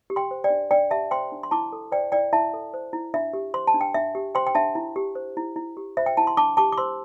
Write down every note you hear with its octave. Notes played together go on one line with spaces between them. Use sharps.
G4
G5 C6
C5
D5 G5
D4
D4 D5 G5
G4 E5 A5
C5 G5 C6
D4
C6
E4 A5 D6
A4
C5 D5 G5
E4 D5 G5
E4 E5 A5
A4
C5
E4
D4 E5
G4
C5 C6
A5
D4
G5
D4 E5
G4
C5 G5 C6
G5
D4 E5 A5
E4
G4
C5
E4
E4
G4
C5 E5
G5
E4 A5
C6
D4 A5 D6
G4 A5 D6
D6
C5 C6 E6